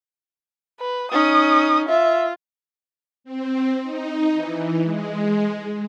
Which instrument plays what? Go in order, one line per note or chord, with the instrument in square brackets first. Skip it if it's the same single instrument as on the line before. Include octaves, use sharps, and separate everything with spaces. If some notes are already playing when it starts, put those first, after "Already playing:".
[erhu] B4
[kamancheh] C#4 D#4 [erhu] D#6
[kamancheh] F4 [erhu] E5
[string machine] C4
D#4
E3
G#3